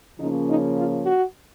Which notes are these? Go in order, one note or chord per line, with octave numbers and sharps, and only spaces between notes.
C#3 F3 A#3 C#4 D#4
D#4
F4
F#4